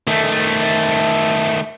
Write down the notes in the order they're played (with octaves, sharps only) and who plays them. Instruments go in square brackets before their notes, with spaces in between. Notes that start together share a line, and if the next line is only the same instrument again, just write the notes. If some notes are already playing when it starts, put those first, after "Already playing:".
[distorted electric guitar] D#3 A3